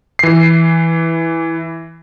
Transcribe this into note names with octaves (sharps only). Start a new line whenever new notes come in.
E3 C7